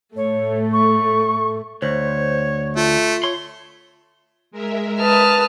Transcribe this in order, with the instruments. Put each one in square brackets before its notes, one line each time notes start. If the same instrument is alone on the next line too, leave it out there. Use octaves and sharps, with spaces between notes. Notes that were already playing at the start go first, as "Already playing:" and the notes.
[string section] A2 A3 [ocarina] C#5
[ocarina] C#6
[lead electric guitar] D2 [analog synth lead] C5 [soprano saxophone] C#5
[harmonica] A3 [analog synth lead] F4
[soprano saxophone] C#5 [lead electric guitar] C6
[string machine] G#3 A#4 E5
[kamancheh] B4 D#6 [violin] A5 F6